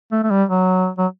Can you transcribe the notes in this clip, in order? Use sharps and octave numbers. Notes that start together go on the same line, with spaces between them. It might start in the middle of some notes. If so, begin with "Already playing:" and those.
A3
A3
G3
F#3
F#3